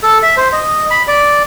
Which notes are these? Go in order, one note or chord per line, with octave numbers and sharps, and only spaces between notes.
A4
E5
C5
D#5
B5
D5